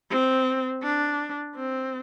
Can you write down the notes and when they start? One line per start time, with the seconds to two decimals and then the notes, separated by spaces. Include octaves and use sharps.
0.10 C4
0.82 D4
1.55 C4